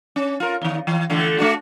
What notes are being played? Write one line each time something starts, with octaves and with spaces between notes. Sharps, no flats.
C#4
F4 A#4
E2 D#3
E3
D3 E3 A3
A3 D4 F#4